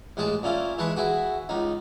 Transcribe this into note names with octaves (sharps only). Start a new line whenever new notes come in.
A1 G#3 G#4 A5
A#2 C#4 E4 F4
E3 G#3 A5 B5 C#6
E4 F#4 G#4
C#2 D#4